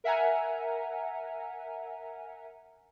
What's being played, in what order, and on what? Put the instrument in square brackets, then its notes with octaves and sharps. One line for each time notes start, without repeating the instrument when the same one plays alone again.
[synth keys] A#4 E5 F#5 G#5 A#5